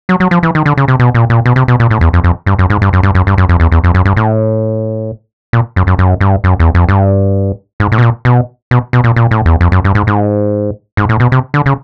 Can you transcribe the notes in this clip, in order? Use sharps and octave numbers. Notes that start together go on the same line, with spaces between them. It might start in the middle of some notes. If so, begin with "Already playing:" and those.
F#3
F#3
F3
E3
D#3
D3
C#3
C3
B2
A#2
A#2
B2
C3
B2
A#2
A2
E2
F2
F2
G2
F#2
G#2
G2
F#2
G2
F#2
G2
F#2
F2
E2
E2
F2
F#2
G2
A2
A#2
F#2
F#2
F#2
G2
F#2
E2
F2
G2
G#2
A2
B2
A#2
B2
B2
B2
A#2
A#2
A2
E2
F2
F#2
G2
G#2
G#2
G#2
A2
B2
C3
D3
C#3